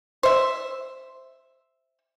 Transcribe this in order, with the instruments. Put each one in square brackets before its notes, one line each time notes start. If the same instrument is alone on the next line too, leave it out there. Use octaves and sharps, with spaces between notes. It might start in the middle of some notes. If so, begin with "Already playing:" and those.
[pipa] C5 E5